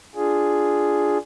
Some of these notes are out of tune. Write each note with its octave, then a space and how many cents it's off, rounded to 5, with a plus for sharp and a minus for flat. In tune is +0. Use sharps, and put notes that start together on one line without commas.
D4 +0 F4 +0 G#4 +0